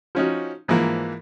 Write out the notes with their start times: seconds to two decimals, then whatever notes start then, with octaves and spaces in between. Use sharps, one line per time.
0.15 F3 C#4 D#4 F#4
0.68 G#2 E3 F3 A#3